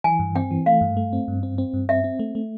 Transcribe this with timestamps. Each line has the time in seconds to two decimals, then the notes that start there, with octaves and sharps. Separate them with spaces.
0.04 E3 G#5
0.19 G2
0.36 C4 G5
0.51 E3
0.66 A3 F5
0.81 G2
0.97 A3
1.13 C4
1.28 G2
1.43 C4
1.58 C4
1.74 G2
1.89 C4 E5
2.04 C4
2.19 A3
2.35 A3